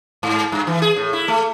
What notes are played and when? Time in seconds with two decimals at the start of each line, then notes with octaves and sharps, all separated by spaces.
0.23 G#2
0.52 G2
0.67 E3
0.82 G#4
0.96 A2
1.13 E4
1.28 A3